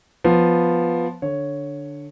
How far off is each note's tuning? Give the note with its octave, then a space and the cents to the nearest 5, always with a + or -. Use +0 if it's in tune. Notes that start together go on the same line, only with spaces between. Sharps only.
F3 +0 B3 +0
D3 +0 C#5 +0